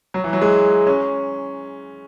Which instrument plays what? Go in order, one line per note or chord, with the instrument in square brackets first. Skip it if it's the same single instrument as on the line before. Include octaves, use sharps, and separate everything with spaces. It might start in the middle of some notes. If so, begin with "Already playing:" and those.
[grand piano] F#3
E3
F#3
G#3
C#4